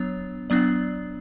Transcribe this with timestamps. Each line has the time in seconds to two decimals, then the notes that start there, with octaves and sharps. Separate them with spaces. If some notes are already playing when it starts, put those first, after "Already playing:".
Already playing: F#3 B3 D4 C#5
0.50 F#3 B3 D4 D5